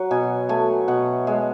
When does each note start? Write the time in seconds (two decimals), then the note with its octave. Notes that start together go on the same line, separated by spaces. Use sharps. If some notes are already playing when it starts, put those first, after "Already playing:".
Already playing: F#3 F#5
0.11 B2 G#5
0.49 A3 G#5
0.88 B2 F#5
1.27 G#3